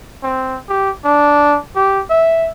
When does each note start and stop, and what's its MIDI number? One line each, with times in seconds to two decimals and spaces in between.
0.23 0.57 60
0.69 0.90 67
1.04 1.57 62
1.75 2.01 67
2.10 2.49 76